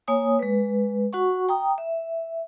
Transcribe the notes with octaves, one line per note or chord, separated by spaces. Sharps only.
A#3 C#5 G#5 D#6
G#3 B4
F#4 F#5 C#6
G5 A#5 D#6
E5